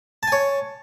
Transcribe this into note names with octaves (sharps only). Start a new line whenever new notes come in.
C#5 G#5 A5